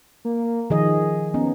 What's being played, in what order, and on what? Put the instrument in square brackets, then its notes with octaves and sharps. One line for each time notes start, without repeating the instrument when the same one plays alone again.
[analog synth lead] A#3
[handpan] D#3 F3 D#5 [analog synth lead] G#4
[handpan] B3 C#4 [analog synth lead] D#4